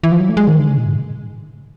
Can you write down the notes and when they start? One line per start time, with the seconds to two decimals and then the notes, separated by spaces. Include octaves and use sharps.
0.03 E3
0.12 F3
0.20 F#3
0.29 A3
0.37 G#3
0.48 D#3
0.59 D3
0.70 C#3
0.78 A#2
0.86 G#2